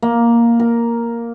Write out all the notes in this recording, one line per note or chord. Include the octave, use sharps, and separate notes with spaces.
A#3
A#4